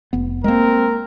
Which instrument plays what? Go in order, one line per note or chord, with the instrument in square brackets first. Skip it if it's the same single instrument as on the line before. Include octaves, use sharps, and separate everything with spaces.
[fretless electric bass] F1 B3
[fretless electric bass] G#3 A#3 [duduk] C4 [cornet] A#4